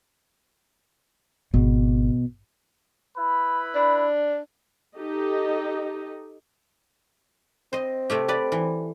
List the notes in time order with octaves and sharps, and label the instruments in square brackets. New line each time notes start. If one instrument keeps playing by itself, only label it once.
[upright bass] G#1 [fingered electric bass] B2
[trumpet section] E4 B4 B5
[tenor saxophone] D4
[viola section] D#4 G4 A4 D#5
[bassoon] C4 [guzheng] C5 D#5
[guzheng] C3 A3 G4
G4 B4 D5
E3